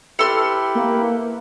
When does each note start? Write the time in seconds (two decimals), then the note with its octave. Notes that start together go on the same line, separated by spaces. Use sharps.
0.19 E4 G4 A4 B4 C6 F6
0.75 A#3